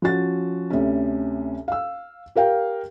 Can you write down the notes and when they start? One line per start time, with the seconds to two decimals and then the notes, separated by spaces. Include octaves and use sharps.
0.02 F3 C#4 F#4 A6
0.70 D2 C3 C#4
1.68 F5 E6
2.36 G4 A#4 F5 G5